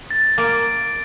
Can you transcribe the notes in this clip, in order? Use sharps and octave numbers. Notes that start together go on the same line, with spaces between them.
A6
A#3 A6 D7